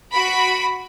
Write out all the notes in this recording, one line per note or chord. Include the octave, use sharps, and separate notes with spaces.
F#4 B5 D7